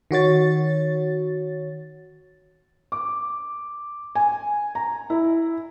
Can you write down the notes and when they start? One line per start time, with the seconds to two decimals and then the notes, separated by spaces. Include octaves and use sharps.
0.11 D#3 F#4 C#5 A6
2.92 D6
4.15 G#5
4.75 A#5
5.10 E4